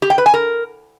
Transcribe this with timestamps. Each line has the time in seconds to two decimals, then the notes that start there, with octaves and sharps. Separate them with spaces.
0.02 G4
0.10 G5
0.18 B4
0.26 G#5
0.34 A#4